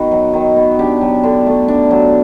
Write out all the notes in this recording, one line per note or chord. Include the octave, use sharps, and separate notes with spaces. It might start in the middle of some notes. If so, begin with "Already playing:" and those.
Already playing: D#3 B3 F#4
F#3
D#3
B3
D4 G4
F#3
D3
A3
D4
F#3